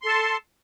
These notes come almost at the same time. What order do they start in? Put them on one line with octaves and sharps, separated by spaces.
C6 A4 A5